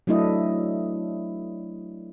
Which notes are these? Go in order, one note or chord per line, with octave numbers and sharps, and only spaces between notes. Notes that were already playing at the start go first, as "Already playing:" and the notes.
F#3 A3 D4 E4 D#5